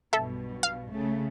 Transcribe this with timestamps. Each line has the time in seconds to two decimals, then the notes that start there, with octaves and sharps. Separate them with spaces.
0.13 B1 G2 B2 A4 E5
0.63 F5
0.92 C#3 A3